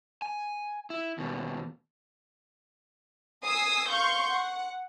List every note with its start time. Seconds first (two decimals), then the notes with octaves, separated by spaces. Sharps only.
0.22 G#5
0.90 E4
1.18 D#2 B2
3.43 G#5 D#6 E6 C7
3.90 F5 C6 C#6 G6
4.29 F#5